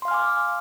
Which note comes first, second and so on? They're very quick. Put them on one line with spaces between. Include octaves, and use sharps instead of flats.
C6 F5 F6 G#5 D6